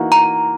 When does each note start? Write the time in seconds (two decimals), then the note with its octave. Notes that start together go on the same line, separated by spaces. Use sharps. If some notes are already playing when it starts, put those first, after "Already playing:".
Already playing: E3 A#3 D#4 F#4
0.12 A#5